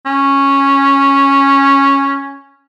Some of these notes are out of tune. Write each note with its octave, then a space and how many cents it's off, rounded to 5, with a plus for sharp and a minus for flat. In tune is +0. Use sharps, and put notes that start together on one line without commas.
C#4 -5